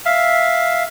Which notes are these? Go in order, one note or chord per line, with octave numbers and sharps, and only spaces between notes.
E5 F5